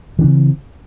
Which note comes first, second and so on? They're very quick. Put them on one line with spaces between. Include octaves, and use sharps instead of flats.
E3 D4 C#3 C4